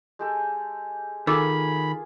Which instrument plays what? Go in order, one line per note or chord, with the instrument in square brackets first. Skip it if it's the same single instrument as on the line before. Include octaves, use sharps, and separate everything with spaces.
[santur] G#3 G4 A4
[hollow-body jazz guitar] D#3 [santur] A#3 F4 G#4 [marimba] A4 D6 E6 [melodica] B5